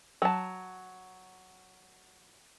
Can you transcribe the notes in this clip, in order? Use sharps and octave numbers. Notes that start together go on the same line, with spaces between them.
F#3 A5